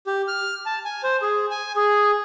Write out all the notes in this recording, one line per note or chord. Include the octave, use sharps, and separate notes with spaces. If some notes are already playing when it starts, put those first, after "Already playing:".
G4
F6
A5
G#5
C5
G#4
G#5
G#4